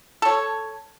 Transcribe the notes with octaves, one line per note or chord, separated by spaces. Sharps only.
A4 C#5